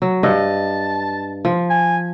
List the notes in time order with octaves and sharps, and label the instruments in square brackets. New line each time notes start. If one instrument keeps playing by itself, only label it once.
[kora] F#3
[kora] G2 D#5 [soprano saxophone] A5
[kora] F3
[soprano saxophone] G#5